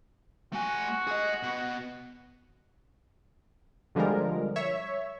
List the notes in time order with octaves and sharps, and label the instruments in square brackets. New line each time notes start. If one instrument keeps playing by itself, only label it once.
[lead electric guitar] A3 G#5 [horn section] F#4
[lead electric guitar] G#4 D#5
B2
[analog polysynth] B2 D3 F3 G3 G#3 A#4
C#5 E5